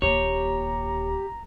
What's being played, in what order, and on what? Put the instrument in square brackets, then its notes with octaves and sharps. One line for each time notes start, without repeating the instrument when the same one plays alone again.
[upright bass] D#1 D#2 [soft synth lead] G4 [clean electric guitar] C#5 [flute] A#5